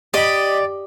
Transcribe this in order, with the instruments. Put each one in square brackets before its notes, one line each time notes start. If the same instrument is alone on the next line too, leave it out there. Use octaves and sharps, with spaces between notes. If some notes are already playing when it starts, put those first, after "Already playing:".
[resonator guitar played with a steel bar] G4 [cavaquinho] D5 [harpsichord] D#5 B5